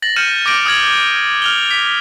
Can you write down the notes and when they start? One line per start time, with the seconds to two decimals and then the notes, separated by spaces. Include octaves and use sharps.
0.02 A6 A#6 F#7
0.16 F6 G6 C#7 D#7 E7
0.46 D6 G6 A#6 D7 F#7
0.66 D#6 F6 G#6 F#7
1.42 F6 F7 G7
1.71 B6